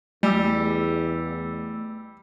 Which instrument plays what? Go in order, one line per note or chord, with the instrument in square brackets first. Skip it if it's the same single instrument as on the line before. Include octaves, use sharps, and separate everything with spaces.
[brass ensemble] E2 [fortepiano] G3 [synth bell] A3 E6